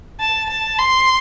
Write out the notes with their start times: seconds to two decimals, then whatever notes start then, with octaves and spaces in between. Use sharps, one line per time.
0.20 A5
0.50 A5
0.79 C6